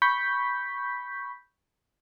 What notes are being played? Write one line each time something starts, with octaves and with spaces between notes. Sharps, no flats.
B5 C#6 G6 B6